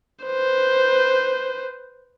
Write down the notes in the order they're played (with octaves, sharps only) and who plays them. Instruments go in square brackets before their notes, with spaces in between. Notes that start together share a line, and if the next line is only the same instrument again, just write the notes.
[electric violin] B4 C5